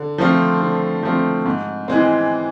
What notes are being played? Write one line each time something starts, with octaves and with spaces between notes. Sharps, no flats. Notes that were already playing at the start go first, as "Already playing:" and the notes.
Already playing: D3
F3 A3 C4 F4
D3
F3 A3 C4 F4
G#2
E3 G#3 C4